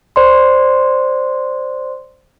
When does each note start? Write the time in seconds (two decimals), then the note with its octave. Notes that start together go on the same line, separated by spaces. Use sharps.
0.16 C5 D5 C6